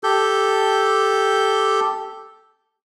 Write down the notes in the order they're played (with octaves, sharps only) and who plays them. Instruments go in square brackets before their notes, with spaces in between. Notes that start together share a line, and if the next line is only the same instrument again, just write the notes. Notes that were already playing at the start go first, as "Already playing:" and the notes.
[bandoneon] G4 A4 G6